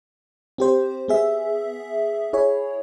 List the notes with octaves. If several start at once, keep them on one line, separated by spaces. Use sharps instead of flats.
C4 G4 C5
B3 G#4 E5
E4 G#4 C#5